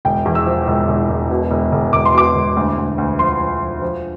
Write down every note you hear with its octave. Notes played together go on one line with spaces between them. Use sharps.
E1 G5
E2
E6
F3
E1
E1
E1
B2
E1
E1
E1 D6
C6
B2 D6
E1
D2
D2
D2
F3 C6
F3
F3
F3